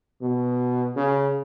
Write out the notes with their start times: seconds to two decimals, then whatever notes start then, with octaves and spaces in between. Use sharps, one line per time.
0.22 B2
0.96 C#3